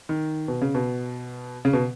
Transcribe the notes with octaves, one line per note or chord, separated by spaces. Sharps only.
D#3
B2
C#3
B2
C#3
B2